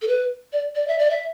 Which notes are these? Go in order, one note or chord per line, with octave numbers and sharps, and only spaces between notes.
A4
B4
D5
D5
E5
D5
E5